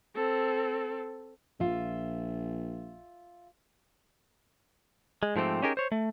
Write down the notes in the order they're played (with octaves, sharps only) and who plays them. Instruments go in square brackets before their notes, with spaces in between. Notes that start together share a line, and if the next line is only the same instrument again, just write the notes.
[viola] C4 A4
[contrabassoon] A#1 [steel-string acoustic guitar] F4 E5
[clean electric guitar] G#3
G#2 F3 A3 C4 G4
C#4 D#4 G4 G#4 A#4
C5 C#5
A3